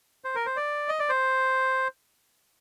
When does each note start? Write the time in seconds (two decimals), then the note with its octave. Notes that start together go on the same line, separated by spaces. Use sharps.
0.24 C5
0.35 A#4
0.46 C5
0.56 D5
0.89 D#5
0.99 D5
1.09 C5